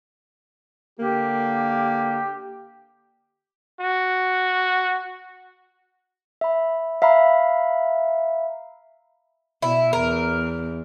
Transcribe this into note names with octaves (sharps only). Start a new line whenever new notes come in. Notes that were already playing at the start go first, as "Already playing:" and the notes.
D3 A#3 G4
F#4
E5 B5
E5 F5 A#5 B5
B2 E4
E2 A#4